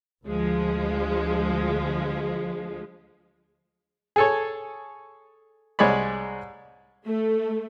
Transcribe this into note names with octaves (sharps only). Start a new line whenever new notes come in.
D2 F3 G#3
G#4 A4 C#5
C2 G#3 C#5 D5 B5
A3